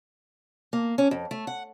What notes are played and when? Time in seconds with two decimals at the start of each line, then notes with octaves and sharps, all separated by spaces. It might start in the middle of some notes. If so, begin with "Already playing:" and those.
0.73 A#3
0.98 C#4
1.11 F2
1.31 A3
1.47 F#5